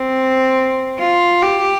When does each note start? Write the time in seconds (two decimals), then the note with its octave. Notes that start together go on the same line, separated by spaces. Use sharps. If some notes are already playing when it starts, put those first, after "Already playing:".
Already playing: C4
1.00 F4
1.42 G4